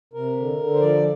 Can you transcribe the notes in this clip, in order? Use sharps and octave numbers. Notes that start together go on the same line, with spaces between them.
C3 A#4
D3
D3
C5
F3 D5